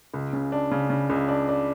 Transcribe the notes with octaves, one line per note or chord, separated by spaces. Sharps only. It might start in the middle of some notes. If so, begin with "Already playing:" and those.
C#2
C#3
D4
C#3
C#3
C#2
D4
D4